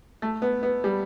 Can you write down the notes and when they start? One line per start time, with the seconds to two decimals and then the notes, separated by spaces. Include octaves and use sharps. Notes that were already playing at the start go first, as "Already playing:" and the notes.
0.22 A3
0.42 B3
0.63 B3
0.84 G3